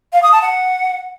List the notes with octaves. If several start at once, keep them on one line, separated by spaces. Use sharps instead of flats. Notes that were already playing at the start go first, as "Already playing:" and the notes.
F5
D#6
A5
F#5